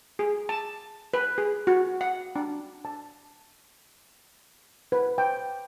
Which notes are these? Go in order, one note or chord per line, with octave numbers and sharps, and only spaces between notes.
G#4
A5
B4
G#4
F#4
F#5
D4
A5
B4
G5